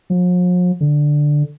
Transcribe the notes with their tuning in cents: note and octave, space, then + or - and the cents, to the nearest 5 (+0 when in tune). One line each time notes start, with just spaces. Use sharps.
F3 +45
D3 +5